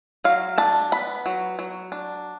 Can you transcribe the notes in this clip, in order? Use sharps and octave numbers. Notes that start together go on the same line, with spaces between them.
F#3 F5
D4 A5
B3 B5
F#3
F#3
D4